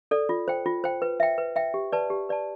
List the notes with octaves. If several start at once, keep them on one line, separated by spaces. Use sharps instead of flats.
A4 D5
F4
C5 G5
F4
C5 G5
B4
E5 G5
B4
E5 G5
G4
B4 D5 A5
G4
B4 D5 A5